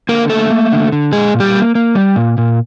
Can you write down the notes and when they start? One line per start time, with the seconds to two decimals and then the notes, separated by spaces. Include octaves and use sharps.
0.09 D3 A#3 A#4
0.30 A3 A#3 A4
0.50 A#3
0.72 D3
0.92 D3
1.12 A#2 G#3 G#4
1.34 A#2
1.40 G3 G4
1.54 A#3
1.75 A#3
1.95 G3
2.16 A#2
2.38 A#2